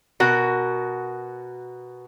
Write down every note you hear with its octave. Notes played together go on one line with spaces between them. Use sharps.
B2 F#4 A#4